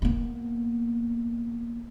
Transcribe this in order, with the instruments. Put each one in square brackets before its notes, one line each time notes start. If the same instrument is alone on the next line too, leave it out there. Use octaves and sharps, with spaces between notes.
[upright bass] A#3 B3